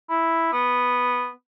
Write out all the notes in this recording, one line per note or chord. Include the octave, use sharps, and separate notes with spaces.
E4
B3